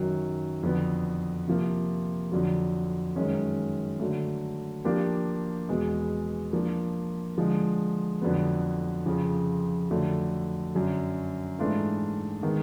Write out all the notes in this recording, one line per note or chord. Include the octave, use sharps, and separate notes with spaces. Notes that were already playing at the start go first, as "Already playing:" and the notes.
Already playing: F#2 D#3 F#3
F2 D3 F#3 B3
C3 F3 A#3
F2 D3 F#3
F#2 D#3 G#3 C#4
D3 F#3 A3
F3 A#3 D4 G4
E2 B2 G#3 B3
F3 A#3 D4
D3 F3 G#3
F2 D3 F#3 B3
F2 C#3 F3
F2 D3 F#3 A3
F#2 D3 F#3
G#2 E3 A3 D4 F4
D#3 G#3 B3